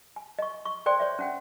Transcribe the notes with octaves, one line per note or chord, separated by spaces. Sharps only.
G#5
D#5 C#6
C#6
A4 C5 D5 G5 C6
C#5 D5 E5
C#4 F#5 G5